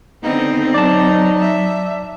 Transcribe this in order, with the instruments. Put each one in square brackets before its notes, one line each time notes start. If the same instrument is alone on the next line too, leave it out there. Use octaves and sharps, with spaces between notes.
[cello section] D3 B3 [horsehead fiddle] C4 [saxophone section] D#4
[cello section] F#3 [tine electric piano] D5 A5
[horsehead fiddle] E5